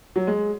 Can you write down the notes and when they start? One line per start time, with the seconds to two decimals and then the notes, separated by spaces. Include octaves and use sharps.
0.16 F#3
0.27 G#3